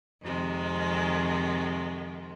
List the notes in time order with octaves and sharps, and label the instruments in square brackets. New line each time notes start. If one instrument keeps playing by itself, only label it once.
[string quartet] F2 C3 D#3 G#3